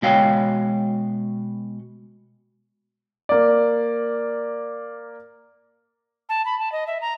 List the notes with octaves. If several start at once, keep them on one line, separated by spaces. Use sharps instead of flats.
B2 G#3 F#4 C#5 F5 G5
A#3 D5
A5
B5
A5
D#5
E5
A#5